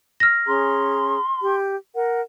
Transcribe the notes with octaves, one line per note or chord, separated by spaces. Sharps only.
F6 A#6
C#4 G#4 A#5 C6
G4
A#4 F#5